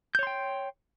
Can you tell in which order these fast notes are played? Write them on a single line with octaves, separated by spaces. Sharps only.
G6 C#5 C6 G5